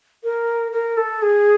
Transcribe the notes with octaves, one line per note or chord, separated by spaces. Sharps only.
A#4
A#4
A4
G#4